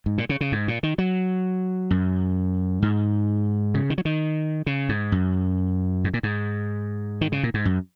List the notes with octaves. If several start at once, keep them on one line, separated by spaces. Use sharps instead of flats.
G#2
A#2
C#3
C#3
G#2
A#2
D#3
F#3
F#2
G#2
C#3
D#3
F#3
D#3
C#3
G#2
F#2
G#2
A#2
G#2
D#3
C#3
A#2
G#2
F#2